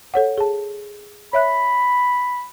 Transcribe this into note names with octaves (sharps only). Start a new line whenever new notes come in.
A4 C#5 F#5
G#4 A5
C#5 E5 B5 F#6